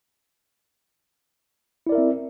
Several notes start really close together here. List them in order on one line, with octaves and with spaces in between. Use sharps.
E4 D5 A#4 E5 C4